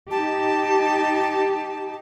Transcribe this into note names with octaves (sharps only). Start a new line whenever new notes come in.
D#4 G4 A5